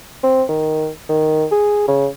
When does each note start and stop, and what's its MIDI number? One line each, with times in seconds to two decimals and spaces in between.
0.23 0.43 60
0.49 0.89 51
1.09 1.45 51
1.51 1.86 68
1.88 2.07 49